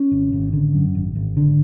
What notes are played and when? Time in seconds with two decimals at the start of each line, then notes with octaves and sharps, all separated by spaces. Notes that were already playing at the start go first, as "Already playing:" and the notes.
Already playing: C#4
0.11 G#1
0.32 G#1
0.53 D3
0.74 F#2
0.95 G#1
1.15 G#1
1.37 D3